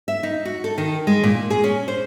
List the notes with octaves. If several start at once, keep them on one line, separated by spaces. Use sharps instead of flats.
E5
D#4
F#4
A4
D#3
G#3
A#2
G#4
C#4
C5